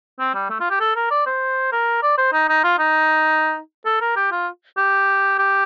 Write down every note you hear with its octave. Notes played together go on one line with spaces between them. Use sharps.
C4
G3
A3
F4
G4
A4
A#4
D5
C5
A#4
D5
C5
D#4
D#4
F4
D#4
A4
A#4
G4
F4
G4
G4